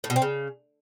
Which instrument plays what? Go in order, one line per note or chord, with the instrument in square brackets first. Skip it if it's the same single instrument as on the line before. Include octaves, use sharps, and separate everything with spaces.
[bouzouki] A2
B2
C4
C#3